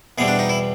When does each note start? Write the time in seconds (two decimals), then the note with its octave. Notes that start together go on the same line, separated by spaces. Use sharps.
0.18 E2 B2 G3 C4 G#4
0.28 D4
0.39 D#4
0.49 E4